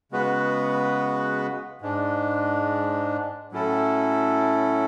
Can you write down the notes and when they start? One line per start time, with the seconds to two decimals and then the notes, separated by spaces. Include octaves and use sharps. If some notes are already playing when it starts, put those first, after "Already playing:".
0.11 C#3 G#3 B3 F#4 B4
1.81 G#2 G#3 D4
3.52 A2 F#3 C#4 E4 A4